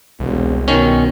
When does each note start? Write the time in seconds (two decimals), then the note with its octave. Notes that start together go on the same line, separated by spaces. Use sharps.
0.20 E1 C2
0.68 B2 D#3 C#4